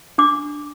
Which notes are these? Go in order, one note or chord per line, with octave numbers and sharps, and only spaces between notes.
D4 D6